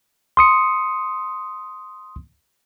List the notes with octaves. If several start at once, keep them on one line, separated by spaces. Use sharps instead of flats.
C6 D#6 C#7